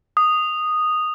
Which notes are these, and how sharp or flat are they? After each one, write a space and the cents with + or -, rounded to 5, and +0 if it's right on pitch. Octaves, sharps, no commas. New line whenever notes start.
D#6 -10